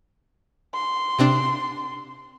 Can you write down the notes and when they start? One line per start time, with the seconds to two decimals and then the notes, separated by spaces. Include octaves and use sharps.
0.74 C6
1.19 C3 C4 D4